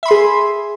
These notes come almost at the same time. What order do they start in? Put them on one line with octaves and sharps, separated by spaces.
E5 B5 C6 G#4